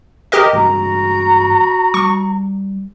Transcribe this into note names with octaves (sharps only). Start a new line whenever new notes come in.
G4 A#4 D#5
G2 E3 G#3 F#4 A#5
G3 C#6